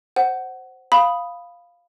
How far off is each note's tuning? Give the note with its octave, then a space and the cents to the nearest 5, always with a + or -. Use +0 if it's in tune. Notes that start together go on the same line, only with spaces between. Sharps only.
C5 +0 F#5 +15
F5 +0 B5 +0 D#6 +0